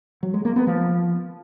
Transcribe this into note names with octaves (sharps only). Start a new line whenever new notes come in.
F#3
G#3
A#3
B3
F3